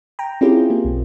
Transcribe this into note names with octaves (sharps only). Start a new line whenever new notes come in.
G5 A#5
C4 C#4 E4 F4 G4 G#4
A#3
B1